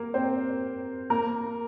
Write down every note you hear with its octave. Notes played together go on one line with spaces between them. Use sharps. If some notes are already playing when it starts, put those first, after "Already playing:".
Already playing: A#3 A#4
C4 C5
A#3 A#4